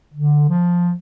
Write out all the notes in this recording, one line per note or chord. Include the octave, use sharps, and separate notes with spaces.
D3
F3